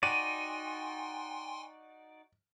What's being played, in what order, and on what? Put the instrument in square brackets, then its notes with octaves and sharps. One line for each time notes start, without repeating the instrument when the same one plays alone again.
[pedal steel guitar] D#4 F#4 D5 [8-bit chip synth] G5 G#5 C6 [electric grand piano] D#7